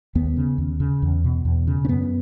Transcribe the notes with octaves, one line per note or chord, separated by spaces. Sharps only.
D#2 B3
C#3
D#2
C#3
E2
B2
E2
C#3
C#4
F#2 B3